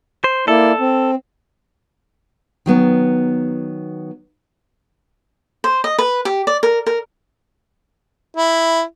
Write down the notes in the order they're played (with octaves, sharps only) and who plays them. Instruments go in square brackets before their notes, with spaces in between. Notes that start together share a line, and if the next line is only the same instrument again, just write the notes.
[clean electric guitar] C5
[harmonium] A#3 E4 D5 [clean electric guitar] A4
[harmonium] C4
[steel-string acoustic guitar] D#3 F#3 B3
[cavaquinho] C5
D#5
B4
G4
D5
A#4
A#4
[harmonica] E4